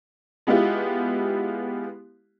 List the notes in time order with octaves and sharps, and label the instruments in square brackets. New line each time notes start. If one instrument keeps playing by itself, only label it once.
[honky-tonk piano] G#3 B3 E4 F4 G4